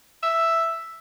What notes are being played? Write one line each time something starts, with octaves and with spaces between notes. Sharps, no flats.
E5